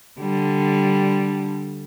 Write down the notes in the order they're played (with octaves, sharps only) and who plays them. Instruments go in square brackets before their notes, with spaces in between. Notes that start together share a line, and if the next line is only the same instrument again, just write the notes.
[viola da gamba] D3 G3